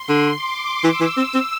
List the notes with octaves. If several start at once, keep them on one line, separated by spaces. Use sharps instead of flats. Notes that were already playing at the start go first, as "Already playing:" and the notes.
Already playing: C6
D3
D6
E3 E6
E3
C4
C4